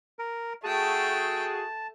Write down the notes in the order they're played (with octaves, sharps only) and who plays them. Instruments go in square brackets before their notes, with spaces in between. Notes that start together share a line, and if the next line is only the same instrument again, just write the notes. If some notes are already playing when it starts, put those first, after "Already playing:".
[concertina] A#4
[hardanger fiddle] A3 G5 [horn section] F#4 G#4 [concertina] A5